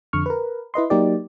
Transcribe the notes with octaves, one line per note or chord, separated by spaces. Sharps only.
F2 D3 C#6 F6
A#4 B4
E4 B4 D#5 C6
F#3 A#3 D#4 G4 D5